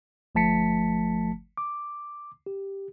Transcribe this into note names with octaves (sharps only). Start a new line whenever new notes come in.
G1 F3 A3 A5 B6 C#7
D6
G4